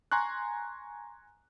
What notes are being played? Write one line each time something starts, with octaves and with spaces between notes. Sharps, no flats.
G#5 A#5 C6 C#6 F#6